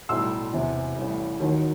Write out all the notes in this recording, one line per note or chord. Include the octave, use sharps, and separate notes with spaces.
B1 A2 G3 C6 E6
E1 E2 C3 E3
A1 A2 G3
D#2 D#3 F#3